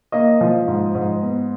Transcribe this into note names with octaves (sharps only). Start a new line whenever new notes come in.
A#3 D#5
F3
G#2
G#2
B3